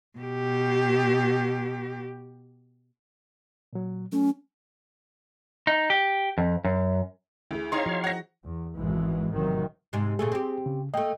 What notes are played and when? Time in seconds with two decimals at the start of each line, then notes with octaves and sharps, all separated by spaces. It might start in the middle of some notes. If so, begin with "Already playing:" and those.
0.19 B2 G4
3.73 A#2 F#3
4.12 F#3 A3 C#4
5.67 D#4
5.90 G4
6.38 F2
6.65 F#2
7.51 D2 E4 G#4
7.72 C4 D#4 C#5 F5 C6
7.86 F3 F#4
8.04 F#5 A#6
8.45 E2
8.77 G#1 F2 G#2 B2 E3 G#3
9.31 A1 C3 D#3 F#3
9.93 G#2 C3
10.19 A#2 C#3 A3 G#4
10.32 C4 G4
10.66 C#3
10.94 A3 A#3 D#5 G5